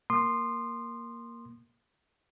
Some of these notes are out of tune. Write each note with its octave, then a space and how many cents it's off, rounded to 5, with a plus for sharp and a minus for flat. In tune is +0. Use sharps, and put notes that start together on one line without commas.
A#3 +0 C6 +0 D#6 -35